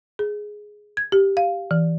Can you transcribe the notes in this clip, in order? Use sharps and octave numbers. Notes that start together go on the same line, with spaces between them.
G#4
G#6
G4
F5
E3